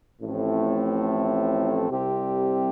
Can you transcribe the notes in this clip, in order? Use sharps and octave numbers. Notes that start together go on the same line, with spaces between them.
A1 A2 F3 A3 C4
C2 C3 G3 C4 G4